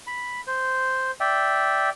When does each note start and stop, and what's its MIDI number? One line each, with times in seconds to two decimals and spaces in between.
0.07 0.41 83
0.47 1.11 72
1.20 1.90 74
1.20 1.90 76
1.20 1.90 79